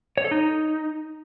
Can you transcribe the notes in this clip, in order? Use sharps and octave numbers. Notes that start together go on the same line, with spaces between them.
C#5
A4
D#4